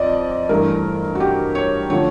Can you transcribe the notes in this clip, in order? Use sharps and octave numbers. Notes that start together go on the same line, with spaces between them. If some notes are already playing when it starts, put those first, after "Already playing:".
Already playing: F2 D5 D#5
G2 E3 A3 A#4
F#4
G4
C#5
D3 F3 A3 D4 C#5